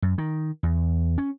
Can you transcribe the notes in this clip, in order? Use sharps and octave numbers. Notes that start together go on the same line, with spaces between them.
F#2
D#3
E2
C#4